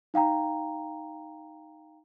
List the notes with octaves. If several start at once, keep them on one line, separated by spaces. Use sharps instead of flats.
D#4 F5 G5 A#5